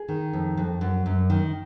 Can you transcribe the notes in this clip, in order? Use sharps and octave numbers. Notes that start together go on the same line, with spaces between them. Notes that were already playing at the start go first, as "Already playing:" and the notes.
Already playing: G#4
D#3
F2
F2
F#2
F#2
D#3